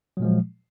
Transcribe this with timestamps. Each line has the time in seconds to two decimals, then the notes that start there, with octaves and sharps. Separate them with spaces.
0.17 F#3
0.20 A#2
0.22 G#3
0.25 F3